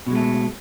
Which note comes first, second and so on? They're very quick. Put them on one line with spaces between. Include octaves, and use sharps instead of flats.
B2 G#3 A3